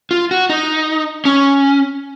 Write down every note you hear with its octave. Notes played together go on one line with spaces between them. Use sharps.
F4
F#4
D#4
C#4